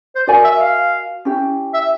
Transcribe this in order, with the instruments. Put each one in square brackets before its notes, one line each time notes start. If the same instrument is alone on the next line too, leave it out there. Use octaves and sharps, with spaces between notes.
[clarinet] C5
[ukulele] F#4 A#4 D#5 G#5 [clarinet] D5
[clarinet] E5
F5
[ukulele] C#4 E4 G4
[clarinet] E5